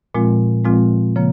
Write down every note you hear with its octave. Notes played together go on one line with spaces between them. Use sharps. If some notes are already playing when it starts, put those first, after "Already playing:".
A#2 F3 G#3 C4 F4
A#2 F3 G#3 C4 F4
C#3 F3 A#3